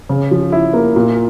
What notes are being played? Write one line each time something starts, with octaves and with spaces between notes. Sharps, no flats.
C#3
F3
E4
A#3
A#2